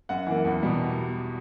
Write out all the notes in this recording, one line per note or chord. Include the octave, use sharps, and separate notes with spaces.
F#2 F#5
E3 A#3
E2
B2 G3